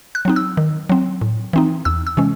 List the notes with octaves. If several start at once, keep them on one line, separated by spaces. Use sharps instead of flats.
F#6
F#3 C4 D#4
E6
D#3
F#3 C4
A2
E3 C4 D#4
E2 E6
E6
C3 E3 G#3 C#4